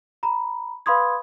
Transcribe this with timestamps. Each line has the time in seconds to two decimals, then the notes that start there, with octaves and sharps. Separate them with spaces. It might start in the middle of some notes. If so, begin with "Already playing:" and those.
0.23 A#5 B5
0.86 B4 F5 B5 C6 D#6 G#6